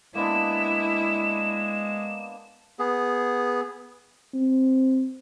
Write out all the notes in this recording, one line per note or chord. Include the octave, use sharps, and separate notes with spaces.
G#3 A#3 B3 D4 E4 E7
B3 G#4
C4